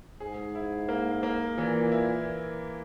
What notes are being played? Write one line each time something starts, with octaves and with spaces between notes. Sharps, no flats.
G#2 G#4
E4
A#3
A#3
A#2 E3
E4